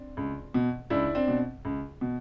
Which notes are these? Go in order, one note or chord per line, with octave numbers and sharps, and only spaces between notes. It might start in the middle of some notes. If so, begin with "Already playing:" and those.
Already playing: C4 D4
C#2
B2
C#2 D4 E4
C4 D4
B2
C#2
B2